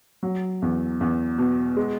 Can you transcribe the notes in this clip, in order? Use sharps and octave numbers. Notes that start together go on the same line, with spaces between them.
F#3
E2
E2
B2
G#3